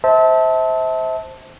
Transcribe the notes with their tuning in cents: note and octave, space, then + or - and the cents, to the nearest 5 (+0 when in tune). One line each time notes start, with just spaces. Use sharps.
C5 +0 E5 -35 A5 +0